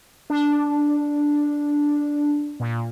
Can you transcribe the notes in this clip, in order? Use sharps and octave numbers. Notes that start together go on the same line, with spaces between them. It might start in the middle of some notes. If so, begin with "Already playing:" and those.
D4
A#2